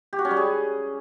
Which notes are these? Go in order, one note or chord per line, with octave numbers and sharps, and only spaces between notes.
G4
F#4
C#4
G3
G#4